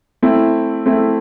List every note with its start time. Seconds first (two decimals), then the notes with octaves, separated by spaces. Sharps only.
0.22 A3 C4 E4
0.86 A3 C4 E4